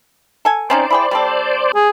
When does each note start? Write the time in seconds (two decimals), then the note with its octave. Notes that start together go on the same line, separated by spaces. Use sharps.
0.45 A4 G#5
0.70 C4 C#4 D#4 C5 D5
0.90 E4 G#4 G5
1.11 G3 C4 A4
1.75 G#4